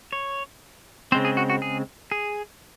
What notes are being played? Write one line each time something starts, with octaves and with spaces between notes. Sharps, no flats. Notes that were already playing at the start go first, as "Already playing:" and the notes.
C#5
C#3 G#3 C4 C5
G#4
F#4
F#4
G#4
G#4